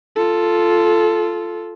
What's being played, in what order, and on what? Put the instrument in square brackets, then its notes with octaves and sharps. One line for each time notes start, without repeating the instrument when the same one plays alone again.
[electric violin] F4 A4